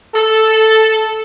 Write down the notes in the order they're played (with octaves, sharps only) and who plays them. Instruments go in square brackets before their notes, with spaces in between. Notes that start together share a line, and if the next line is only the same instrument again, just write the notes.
[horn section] A4